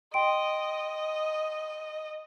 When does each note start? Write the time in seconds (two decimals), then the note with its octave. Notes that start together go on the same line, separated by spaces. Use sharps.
0.14 D#5 G5 C6 D7